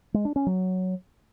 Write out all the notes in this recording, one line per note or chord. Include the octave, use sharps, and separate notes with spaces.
G#3
D4
C#4
F#3